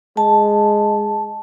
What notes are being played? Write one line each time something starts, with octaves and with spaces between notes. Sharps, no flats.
G#3 A5